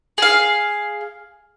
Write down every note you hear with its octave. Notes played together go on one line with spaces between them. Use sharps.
G#4 F5